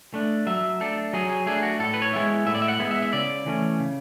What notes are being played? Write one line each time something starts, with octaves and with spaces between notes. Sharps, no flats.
A3 D4
F#3 E5
A3 D4 A4
F#3 G#4
G#4
A3 D4 G#4
F#4
A2 A4
B4
C#5
G#3 B3 E4
A2 E5
D5
E5
F#5
G#3 B3 E4
E5
E5
C#3 D5
E3 A3 C#4
C#3